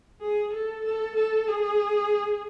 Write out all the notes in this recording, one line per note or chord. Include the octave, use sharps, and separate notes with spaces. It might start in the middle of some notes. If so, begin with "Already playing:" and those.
G#4
A4
A4
A4
G#4